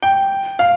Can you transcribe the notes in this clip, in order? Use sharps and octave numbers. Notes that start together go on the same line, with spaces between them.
G5
F5